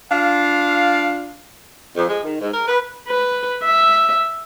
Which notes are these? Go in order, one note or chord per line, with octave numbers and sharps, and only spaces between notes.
D4 F4 F5
F2
G#3
D#3
G#2
A#4
B4
B4
E5